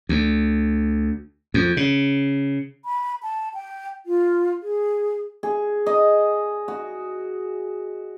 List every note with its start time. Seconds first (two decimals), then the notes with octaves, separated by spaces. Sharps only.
0.09 D2
1.54 F2
1.77 C#3
2.85 B5
3.23 A5
3.54 G5
4.06 F4
4.63 G#4
5.43 G#4
5.86 D#5
6.68 F#4